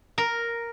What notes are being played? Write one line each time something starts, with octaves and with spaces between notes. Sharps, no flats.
A#4